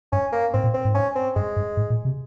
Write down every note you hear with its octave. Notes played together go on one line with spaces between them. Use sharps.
G2 C#4
A#3
G#2 C4
A#2
C4
G#2
C#4
C4
G2 G#3
G2
G#2
A#2
C3